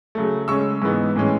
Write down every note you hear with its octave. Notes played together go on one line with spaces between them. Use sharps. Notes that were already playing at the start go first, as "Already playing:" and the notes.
C#3 F#3 A3
C#3 G#3 C#4 C#6 E6
G#2 E3 B3 D#4
A2 E3 G#3 C#4